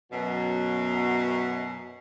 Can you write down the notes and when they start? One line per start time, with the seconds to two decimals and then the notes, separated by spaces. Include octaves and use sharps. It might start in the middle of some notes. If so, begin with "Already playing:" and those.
0.12 F#2 B2